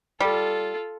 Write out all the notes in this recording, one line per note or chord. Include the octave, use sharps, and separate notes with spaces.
G3 F4 A4